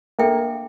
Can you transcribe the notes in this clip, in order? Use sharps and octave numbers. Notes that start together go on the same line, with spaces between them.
A#3 D4 A4 E5 G5